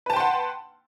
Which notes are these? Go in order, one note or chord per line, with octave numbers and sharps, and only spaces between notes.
B4 F#5 G5 A5 C6